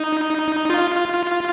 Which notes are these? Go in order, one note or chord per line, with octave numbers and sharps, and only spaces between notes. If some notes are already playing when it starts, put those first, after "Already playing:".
Already playing: D#4
F4